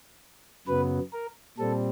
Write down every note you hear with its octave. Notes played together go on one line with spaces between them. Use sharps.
F#2 C#3 F#3 B3 B4
A#4
A#2 G3 C4 A4